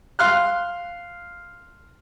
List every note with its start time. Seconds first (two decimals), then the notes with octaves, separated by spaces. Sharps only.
0.19 F5 C6 F6 F#6